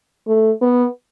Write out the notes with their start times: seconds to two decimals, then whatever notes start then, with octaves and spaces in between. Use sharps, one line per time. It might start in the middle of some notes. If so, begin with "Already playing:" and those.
0.27 A3
0.61 B3